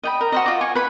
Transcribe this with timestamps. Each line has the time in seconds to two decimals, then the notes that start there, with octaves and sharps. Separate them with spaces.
0.03 D#5 G5 B5
0.21 A#4
0.32 F#4 C5 D#5
0.46 F4 D6
0.61 G#5 C#6
0.75 B4 B5